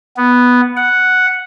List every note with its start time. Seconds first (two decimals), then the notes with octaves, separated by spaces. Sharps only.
0.17 B3
0.76 F#5